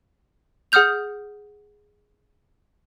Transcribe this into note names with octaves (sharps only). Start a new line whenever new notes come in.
G#4 F#5 D#6 F6 G6 F7